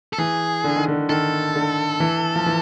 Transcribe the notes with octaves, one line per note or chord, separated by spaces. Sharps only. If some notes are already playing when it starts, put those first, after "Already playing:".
A4
E3 G#4
D3
D#3
D3
D#3 A4
D3
E3
F3
E3